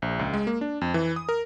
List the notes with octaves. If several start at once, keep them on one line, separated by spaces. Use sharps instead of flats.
A#1
C#2
G#3
A#3
D4
F2
E3
D#6
A#4